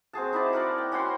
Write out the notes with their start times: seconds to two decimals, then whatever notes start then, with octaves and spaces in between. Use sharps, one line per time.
0.13 C4 F#4 G#4 A5
0.33 D#4 E4 D5 A5
0.53 F#4 A#4 D5
0.78 G5
0.92 C#4 F#4 G5 C6